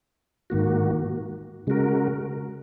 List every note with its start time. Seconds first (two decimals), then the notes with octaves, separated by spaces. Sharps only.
0.50 G#2 D#3 A#3 F#4
1.67 C#3 G#3 F#4 A#4